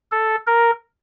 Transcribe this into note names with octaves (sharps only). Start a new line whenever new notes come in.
A4
A#4